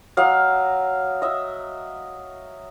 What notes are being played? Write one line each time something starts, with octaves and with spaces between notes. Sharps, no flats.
F#3 D#5 F5
D#5 E5